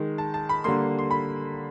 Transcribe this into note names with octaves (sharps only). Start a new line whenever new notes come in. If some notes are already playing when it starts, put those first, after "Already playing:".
Already playing: D#3 G#3
A5
A5
B5
D3 G3 A#3 C6
C6
B5